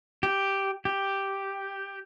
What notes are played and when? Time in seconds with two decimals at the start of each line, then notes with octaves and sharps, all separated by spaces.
0.23 G4
0.85 G4